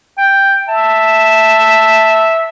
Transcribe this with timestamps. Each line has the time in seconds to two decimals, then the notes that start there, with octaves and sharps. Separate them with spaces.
0.18 G5
0.68 E5 A5